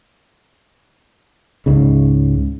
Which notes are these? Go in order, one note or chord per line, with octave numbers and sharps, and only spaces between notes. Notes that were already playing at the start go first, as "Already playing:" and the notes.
C#2 G#2 C#3